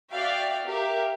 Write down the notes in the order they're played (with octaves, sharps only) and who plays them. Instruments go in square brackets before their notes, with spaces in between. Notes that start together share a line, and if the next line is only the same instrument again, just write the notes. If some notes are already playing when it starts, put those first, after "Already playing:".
[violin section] F#4 D5 E5 F5 G5
G4 A#4 E5 F5